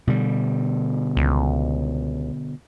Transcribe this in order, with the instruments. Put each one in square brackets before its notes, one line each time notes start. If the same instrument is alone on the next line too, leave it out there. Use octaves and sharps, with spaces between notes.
[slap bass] B2 D3 G3
[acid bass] C#2